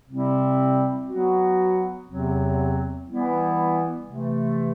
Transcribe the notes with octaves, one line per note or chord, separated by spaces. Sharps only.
C3 G3 C4 E4
F#3 B3 F#4
E2 C3 F#3 C4
E3 G3 B3 E4
C3 E3 A3